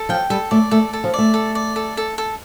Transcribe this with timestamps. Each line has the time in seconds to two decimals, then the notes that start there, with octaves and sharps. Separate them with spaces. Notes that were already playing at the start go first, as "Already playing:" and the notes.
Already playing: A4
0.09 F3 G5
0.30 G3 A4
0.51 A3 D5
0.71 A3 A4
0.93 A4
1.04 F3
1.14 A3 D5
1.34 A4
1.55 D5
1.76 A4
1.97 A4
2.18 A4